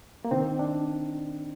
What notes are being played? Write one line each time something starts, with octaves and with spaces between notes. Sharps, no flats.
A#3
D#3 C4
D4